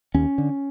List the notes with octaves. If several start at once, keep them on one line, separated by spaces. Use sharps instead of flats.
D#2 C#4
D3